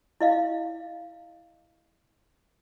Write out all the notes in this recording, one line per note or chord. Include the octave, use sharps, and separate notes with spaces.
E4 D#5 F5